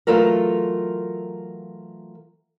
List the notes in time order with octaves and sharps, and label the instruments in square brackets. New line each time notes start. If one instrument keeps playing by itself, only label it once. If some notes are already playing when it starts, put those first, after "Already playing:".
[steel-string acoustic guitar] E3 F#3 A3 F4 A4 A#4